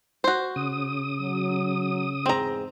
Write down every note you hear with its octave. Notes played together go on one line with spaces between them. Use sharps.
F#4 C5
C#3 D#6
F#3
E2 G#2 C4 G#4 A#5